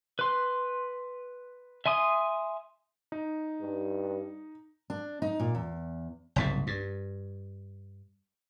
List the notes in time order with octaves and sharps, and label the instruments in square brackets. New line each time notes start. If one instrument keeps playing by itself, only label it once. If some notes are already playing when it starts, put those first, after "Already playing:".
[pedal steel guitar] B4 C6
E5 G#5 C6 D#6
[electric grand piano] D#4
[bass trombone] G2
[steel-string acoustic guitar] D4
D#4
A#2
E2
[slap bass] F#1 C2 G#2
G2